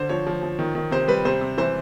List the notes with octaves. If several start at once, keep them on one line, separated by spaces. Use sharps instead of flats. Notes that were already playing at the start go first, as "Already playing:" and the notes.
Already playing: D3 C5
F3 C#5
F3
F3
D#3
D#3
C3 C5
G3 B4
C3 C5
C3
E3 C5